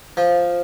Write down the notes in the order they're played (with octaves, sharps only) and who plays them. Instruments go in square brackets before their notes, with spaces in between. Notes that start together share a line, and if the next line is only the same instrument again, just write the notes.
[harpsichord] F3